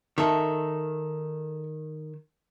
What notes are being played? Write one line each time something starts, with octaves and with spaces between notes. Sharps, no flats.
D#3 A4 E5